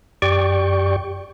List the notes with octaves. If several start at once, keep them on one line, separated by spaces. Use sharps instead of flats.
F#2 G4 D5 G5 C#6